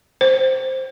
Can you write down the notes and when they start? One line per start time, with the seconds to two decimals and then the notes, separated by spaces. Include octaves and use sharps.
0.21 C5